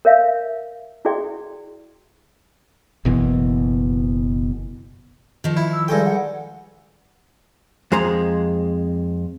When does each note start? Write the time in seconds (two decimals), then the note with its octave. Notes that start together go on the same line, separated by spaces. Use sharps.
0.05 A#4 C#5 E5 F5
1.05 E4 F#4 G#4 D5 G5
3.05 F#1 B2 E3
5.44 D#3 F3
5.57 E4
5.73 E6
5.88 G2 G#3 A4 G5
6.05 F#5
7.92 F2 G#3 C5 A#5